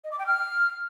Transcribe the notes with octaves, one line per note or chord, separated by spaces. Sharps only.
D#5
D6
G5
F6